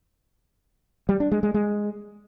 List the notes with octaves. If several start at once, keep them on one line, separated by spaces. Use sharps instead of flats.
G3
D4
G#3
G#3
G#3